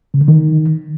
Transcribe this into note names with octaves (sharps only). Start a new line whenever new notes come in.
C#3
D3
D#3